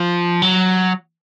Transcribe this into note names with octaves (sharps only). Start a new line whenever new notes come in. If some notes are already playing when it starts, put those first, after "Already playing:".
Already playing: F3
F#3